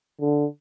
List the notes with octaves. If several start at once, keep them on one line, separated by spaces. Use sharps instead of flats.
D3